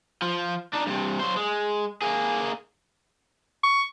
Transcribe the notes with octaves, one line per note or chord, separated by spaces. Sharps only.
F3
D4 D#4
G2 C3
F#3 C5
G#3
A#3 G#4
C#6